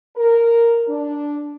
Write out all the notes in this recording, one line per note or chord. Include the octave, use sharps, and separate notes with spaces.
A#4
D4